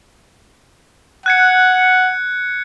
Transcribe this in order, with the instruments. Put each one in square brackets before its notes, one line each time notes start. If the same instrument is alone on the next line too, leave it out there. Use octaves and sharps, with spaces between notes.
[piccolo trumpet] F#5 [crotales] F#6 G#6 C#7